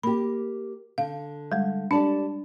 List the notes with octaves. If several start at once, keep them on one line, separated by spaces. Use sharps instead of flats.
A#3 G4 B5
D3 F5
G3 G#3
D4 G4 D5 A5